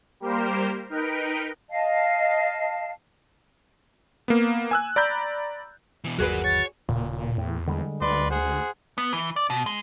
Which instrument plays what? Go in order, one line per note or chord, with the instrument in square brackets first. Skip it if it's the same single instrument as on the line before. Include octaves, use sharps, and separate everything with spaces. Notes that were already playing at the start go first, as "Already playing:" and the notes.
[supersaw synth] G3 A#3 G4 A#4 C5
D#4 A#4 B4 G5
[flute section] D#5 F5 A5
[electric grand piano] A#3 B3
G#5 E6 F#6
D5 A#5 B5 G6
[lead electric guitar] B2 E3
[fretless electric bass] G1 D#2 F#3 [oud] F#4 G#4 B4 [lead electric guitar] A#4 D5
[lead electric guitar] C#5 [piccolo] A6
[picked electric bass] D#1 C#3 [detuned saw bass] A#2
[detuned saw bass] E2 [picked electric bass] A2
[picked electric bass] D3 G3 G#3
[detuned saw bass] D2 [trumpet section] B4 D5 C6
[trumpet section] G#4 C5 F#5
[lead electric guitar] B3
E3
D5
B2
G#3